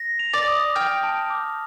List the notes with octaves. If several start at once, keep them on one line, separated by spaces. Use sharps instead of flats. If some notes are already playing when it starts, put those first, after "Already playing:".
Already playing: A#6
F7
D5
D#6
G5 F6
A5
D6